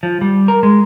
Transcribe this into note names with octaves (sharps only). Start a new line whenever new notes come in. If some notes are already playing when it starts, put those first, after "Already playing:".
F3
G3
A#4
G#3